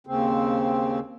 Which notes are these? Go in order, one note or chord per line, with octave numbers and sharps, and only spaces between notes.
D#2 C#3 C4